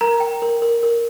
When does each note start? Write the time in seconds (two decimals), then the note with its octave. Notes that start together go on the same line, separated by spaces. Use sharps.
0.01 A#4 A#5
0.20 G5
0.42 A#4
0.62 A#4
0.83 A#4